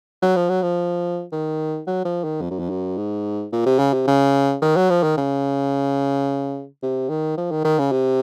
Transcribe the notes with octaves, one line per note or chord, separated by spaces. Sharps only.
F#3
F3
F#3
F3
D#3
F#3
F3
D#3
F2
F#2
F2
F#2
G#2
A#2
C3
C#3
C3
C#3
D#3
F#3
F3
D#3
C#3
C3
D#3
F3
D#3
D#3
C#3
C3